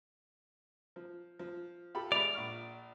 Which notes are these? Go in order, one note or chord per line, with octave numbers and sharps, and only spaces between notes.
F3
F3
F4 G4 A4 B5
G#3 D5 E5 B5 F7
A#1 C#6 F6